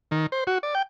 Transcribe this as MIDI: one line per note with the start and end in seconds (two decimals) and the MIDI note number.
0.11 0.26 51
0.32 0.44 72
0.47 0.58 66
0.63 0.75 74
0.75 0.82 79